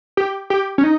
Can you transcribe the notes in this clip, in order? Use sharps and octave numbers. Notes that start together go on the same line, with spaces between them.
G4
G4
C#4
D#4